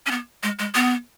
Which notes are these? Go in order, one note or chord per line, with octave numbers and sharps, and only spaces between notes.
C#4
B3
G#3
G#3
B3